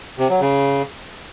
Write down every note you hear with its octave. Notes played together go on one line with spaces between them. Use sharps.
C3
F#3
C#3